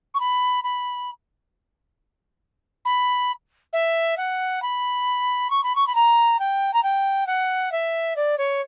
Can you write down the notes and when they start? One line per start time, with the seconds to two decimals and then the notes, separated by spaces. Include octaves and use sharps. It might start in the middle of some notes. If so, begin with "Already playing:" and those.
0.14 C#6
0.20 B5
0.64 B5
2.85 B5
3.73 E5
4.17 F#5
4.62 B5
5.50 C#6
5.64 B5
5.76 C#6
5.87 B5
5.95 A#5
6.39 G5
6.74 A#5
6.83 G5
7.27 F#5
7.72 E5
8.16 D5
8.38 C#5